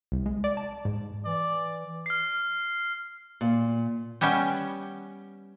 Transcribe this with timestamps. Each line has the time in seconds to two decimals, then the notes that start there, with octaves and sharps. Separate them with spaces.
0.12 C2
0.26 G#3
0.44 D5
0.57 A5
0.85 G#2
1.25 E3 D5
2.06 F6 C7
3.41 A#2
4.21 G3 B3 C#4 E5 G5